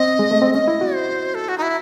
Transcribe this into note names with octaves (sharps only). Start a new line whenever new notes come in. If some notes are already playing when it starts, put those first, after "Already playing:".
Already playing: C4 D#5
G#3
A3
C4
C#4 D#5
E4
F#4
C5
A4
F#4
D#4
E4